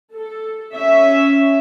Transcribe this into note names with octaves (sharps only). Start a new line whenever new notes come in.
A4
C#4 E5